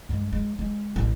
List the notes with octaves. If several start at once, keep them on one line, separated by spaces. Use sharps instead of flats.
G2 G#3
G#3
G#3
A1